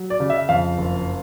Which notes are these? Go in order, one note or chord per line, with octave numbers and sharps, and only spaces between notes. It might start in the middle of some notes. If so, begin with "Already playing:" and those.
Already playing: F#3
D5
C#3
E5
F2 F5
F#1